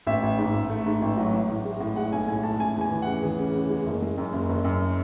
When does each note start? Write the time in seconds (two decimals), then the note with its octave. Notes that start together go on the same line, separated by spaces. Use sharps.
0.07 A1 E5
0.23 A1
0.38 G#2
0.54 A1
0.70 A3
0.86 G#2
1.02 A1
1.17 F#3
1.34 A2
1.50 A2
1.65 G#3
1.80 A2
1.96 G#3 F#5
2.13 B1 G#5
2.28 A2 G#5
2.43 A2 A5
2.60 C#3 G#5
2.76 E2
2.81 G#5
2.91 E3
3.02 F#5
3.07 C#3
3.23 E3 G#4
3.39 C#3
3.54 C#3
3.70 G#3
3.86 F#1
4.02 G#3
4.18 F#2
4.33 F#1
4.49 F#1
4.65 F#2